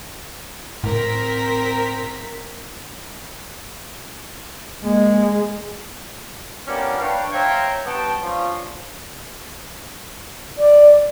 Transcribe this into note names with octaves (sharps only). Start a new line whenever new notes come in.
A2 C4 A#4 B6
G#3 A#3
B3 C#4 D4 F4 G4 A#4
D4 B4 C#5 F5 G5
C5 C#5 E5 F5 G5 A#5
G2 B3 C#5 G5 A5
F3 C#4 D4
D5